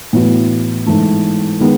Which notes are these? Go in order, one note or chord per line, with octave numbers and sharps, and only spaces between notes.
A2 E3 B3 F#4
G#2 E3 A3
D#3 G#3 B3